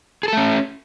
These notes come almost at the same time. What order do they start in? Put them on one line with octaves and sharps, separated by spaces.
G#4 A4 A3 C#4